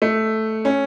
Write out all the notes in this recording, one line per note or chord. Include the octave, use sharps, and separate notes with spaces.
A3
C#4